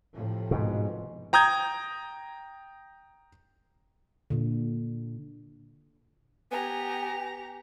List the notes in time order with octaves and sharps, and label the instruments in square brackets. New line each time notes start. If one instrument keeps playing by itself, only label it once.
[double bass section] A2 C3 F3
[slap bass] G#2 B2
[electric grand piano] G5 A#5 D#6 G6 G#6
[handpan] A#2 D3
[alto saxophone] B3 [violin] G4 A#5 [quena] G#5